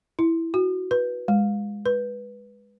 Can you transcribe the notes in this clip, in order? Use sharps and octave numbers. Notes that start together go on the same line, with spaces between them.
E4
F#4
B4
G#3
B4